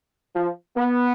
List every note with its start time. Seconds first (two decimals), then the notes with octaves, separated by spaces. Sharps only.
0.35 F3
0.77 B3